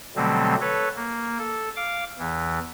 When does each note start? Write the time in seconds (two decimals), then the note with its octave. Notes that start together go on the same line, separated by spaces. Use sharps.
0.16 B2 D3 F#3 G3 A3 C4
0.61 A4 B4 C#5
0.96 A#3
1.38 A4
1.76 F5 D6
2.19 E2 E3